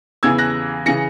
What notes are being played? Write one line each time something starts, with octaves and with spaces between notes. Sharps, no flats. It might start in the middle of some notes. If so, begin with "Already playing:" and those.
E2 C#3 E3 E6 G#6
F#6 A#6
C#3 E3 A#6 C#7